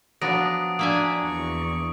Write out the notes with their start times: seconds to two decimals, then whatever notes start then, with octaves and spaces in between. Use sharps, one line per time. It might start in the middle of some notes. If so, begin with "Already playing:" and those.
0.21 F3 F#3 B3 D4 D#6 A#6 D7
0.79 F3 A#3 D4 E5 G#5 D#6
1.23 E2 D4 C#6